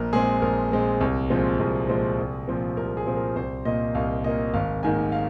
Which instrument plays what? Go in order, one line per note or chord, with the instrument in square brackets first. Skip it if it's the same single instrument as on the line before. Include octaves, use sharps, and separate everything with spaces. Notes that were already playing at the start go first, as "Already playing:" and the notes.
Already playing: [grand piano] A#1 A#4
A#2 G#3 C4 G#4
A#1 A#4
A#2 G#3 C4
C2
A#2 F3 G#3 C4
C2 G#4
A#2 F3 G#3 C4
C2
A#2 F3 C4
C2 A#4
G#4
A#2 F3 C4
A#4
C2 C5
A#2 A#3 D#5
C2 F5
A#2 A#3 D#5
G#1 F5
G#2 D#3 A#3 G#5
F5